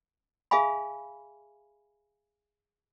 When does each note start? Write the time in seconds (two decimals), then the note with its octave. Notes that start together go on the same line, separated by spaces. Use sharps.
0.51 G#4 E5 F5 G#5 B5